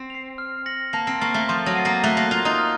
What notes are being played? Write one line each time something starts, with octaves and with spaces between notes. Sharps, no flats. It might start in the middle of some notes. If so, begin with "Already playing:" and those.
Already playing: C4
C7 F7
F6
A#6 C#7 F#7
A#3 A5
C4
A#3 C#6 F6 A6
A3
F3 C6
F#3
D#6 A6 C7 D#7
A#3
A3 F#6
A#3
F4 C7 F7
D#4
F6